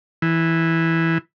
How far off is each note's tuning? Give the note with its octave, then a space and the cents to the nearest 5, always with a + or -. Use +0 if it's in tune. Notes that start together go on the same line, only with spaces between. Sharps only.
E3 -5